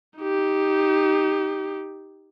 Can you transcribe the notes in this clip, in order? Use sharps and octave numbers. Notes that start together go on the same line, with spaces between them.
D#4 G4